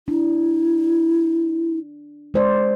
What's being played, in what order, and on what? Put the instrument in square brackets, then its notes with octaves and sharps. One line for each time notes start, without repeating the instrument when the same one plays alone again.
[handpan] D4 [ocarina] E4
[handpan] G#3 C5 D5